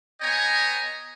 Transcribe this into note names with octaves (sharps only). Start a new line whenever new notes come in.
B3 C#5 D#5 G5 G#5 A#5